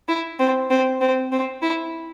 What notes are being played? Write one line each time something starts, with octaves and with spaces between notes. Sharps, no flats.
E4
C4
C4
C4
C4
E4